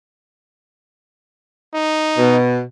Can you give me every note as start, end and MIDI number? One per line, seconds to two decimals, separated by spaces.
1.74 2.37 63
2.17 2.59 47